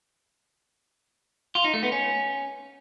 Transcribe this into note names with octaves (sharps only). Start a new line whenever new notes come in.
F4
D#4
A3
B3
C#4